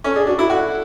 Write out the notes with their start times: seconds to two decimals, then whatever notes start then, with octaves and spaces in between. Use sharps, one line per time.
0.04 C#4 A4
0.16 D4 G#4
0.27 D4 F#4
0.38 E4 F#4
0.49 F#4 A4